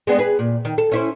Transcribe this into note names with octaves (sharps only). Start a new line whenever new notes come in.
G#3 B3 D4
G#4 B4
A#2
D#3
A4
C#4 E4 C5